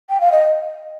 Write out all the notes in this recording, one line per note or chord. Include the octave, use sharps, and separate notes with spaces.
G5
F5
D#5